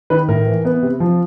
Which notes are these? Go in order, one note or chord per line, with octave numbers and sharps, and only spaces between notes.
D#3 B4
A2 A#4
E3
B3
C3
F3